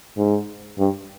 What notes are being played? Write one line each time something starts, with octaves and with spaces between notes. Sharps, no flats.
G#2
G2